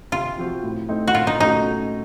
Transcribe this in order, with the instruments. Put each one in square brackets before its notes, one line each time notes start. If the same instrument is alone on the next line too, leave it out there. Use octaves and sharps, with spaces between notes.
[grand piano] C3 [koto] F4
[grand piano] F3 C4 F#4
A2
A3 C4 D#4
[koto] F#4
[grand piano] A#2 [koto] F4
[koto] D#4
[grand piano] A3 C#4 F#4 [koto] D#4